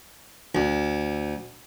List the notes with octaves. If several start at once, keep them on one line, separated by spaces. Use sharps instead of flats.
D2